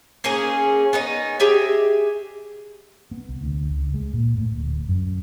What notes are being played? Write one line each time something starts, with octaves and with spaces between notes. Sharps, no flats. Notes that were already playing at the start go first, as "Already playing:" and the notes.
A#3 C#4 D#4 G#4
B3 C#4 D#4
G4 G#4 E5
B3
C2
D2
C#2
G#3
A#2
A2
D1
F#2